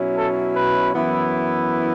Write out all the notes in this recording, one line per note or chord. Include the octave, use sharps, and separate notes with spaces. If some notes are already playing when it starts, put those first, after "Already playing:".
Already playing: B2 F#3 C#4 E4
A4
B4
F#2 E3 B3 E4